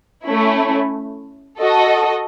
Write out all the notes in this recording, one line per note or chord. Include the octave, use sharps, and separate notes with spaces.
A3 C#4 E4
F#4 A4 D#5